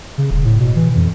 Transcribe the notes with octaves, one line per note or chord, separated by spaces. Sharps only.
C#3
D#1
A2
B2
E3
F2